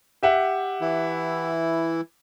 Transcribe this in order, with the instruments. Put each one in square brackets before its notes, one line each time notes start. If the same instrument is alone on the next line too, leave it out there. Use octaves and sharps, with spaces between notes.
[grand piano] G4 E5 F#5
[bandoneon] E3 E4